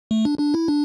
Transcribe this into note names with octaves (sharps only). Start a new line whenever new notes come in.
A3
D4
D4
E4
D4